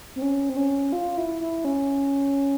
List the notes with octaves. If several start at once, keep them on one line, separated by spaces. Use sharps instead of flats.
C4
C#4
C4
C#4
F4
E4
E4
C#4